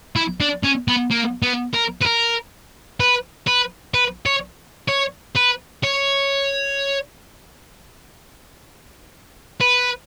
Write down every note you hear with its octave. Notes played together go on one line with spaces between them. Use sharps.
E4
D4
C#4
B3
A#3
B3
A#4
B4
A#4
B4
B4
B4
C#5
C#5
B4
C#5
B4